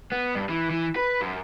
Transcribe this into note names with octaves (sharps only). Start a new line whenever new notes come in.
B3
G2
E3
E3
B4
F#2